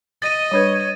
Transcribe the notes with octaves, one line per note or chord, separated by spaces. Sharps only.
D#5 A6 D#7
G3 D4 B4 C#5